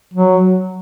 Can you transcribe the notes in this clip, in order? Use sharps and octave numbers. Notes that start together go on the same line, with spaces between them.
F#3